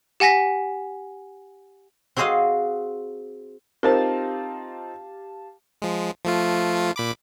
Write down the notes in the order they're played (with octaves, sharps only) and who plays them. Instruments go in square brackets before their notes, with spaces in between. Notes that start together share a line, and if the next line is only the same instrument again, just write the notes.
[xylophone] G4 F#5 G#5 A#6 B6
[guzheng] C4 F#4 G#4 C5 D#5 F5
[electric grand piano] C4 D#4 F4 [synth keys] G4 F5 A5 [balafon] A#4 C5
[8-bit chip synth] F3 G#3
F3 A3 F4
A#2 B5 D6